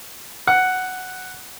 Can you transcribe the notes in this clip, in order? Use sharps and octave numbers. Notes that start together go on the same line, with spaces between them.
F#5